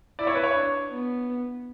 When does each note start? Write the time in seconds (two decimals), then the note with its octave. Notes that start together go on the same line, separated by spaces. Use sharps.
0.19 E4 D5
0.27 C#5
0.35 B4
0.44 C#5
0.54 D4
0.90 B3